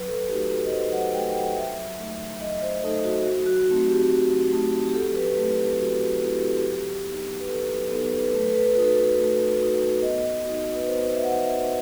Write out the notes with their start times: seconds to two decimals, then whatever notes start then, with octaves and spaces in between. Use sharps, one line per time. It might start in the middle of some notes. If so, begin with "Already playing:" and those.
Already playing: F#3 B4
0.08 A4
0.28 A3 D#4 F#4 G4
0.51 A4
0.66 D#5
0.71 F#3 C5
0.93 F#5
1.13 A3 D#4 F#4 G5
1.35 F#5
1.56 F#3 E5
1.98 A3 D#4
2.40 F#3 D#5
2.62 C5
2.83 A3 D#4 A4
3.04 F#4
3.25 F#3 F#4
3.46 F#4
3.68 A3 C4 D#4 F#4
3.88 G4
4.10 F#3
4.52 A3 C4 D#4 F#4
4.89 G4
4.94 F#3 A4
5.15 B4
5.37 A3 C4 E4 A4
5.58 G4
5.79 F#3 F#4
6.07 F#4
6.22 A3 C4 E4
6.36 G4
6.43 A4
6.50 G4
6.64 F#3
7.06 B3 D#4
7.40 B4
7.49 F#3 A4
7.91 B3 D#4 A4
8.00 B4
8.10 A4
8.19 B4
8.29 A4
8.33 A3 B4
8.47 A4
8.56 B4
8.66 A4
8.75 D#4 F#4 B4
8.84 A4
8.94 B4
9.03 A4
9.18 A3
9.60 D#4 F#4
10.02 B3 D#5
10.45 D#4 F#4
10.75 B4
10.87 B3 C5
11.15 E5
11.23 F#5
11.29 D#4 F#4 E5
11.44 E5